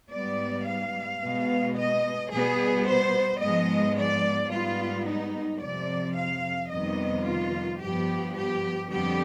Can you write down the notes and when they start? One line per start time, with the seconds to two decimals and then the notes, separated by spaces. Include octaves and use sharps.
0.12 G#2 G3 B3 D5
0.67 F5
1.22 B2 G#3 B3
1.76 D#5
2.31 B2 G3 B3 G#4
2.86 C5
3.41 G#2 F3 G#3 B3 D#5
3.97 D5
4.51 G#2 G3 B3 F4
5.06 D#4
5.61 F2 C3 F3 D5
6.16 F5
6.71 F2 C3 D#3 G3 B3 D#5
7.25 F4
7.80 G2 F3 B3 G4
8.36 G4
8.90 F2 D3 G3 B3 G4